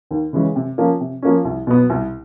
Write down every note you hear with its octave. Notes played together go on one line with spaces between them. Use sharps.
D#2
C#3 E3 G#3 C#4
C3
F3 A#3 C#4
C3
F3 A#3 C#4
C2
B2 F#3 B3
C2